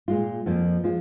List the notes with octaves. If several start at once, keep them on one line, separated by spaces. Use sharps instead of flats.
A#2 G#3 F4
F2 F3 A#3
F3 G#3 F4